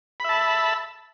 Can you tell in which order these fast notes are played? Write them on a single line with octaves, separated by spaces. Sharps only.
B5 E5 A5